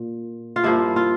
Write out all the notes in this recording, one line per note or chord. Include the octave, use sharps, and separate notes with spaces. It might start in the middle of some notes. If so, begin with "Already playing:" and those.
Already playing: A#2
F4
G2 F3 A#3 E4
F4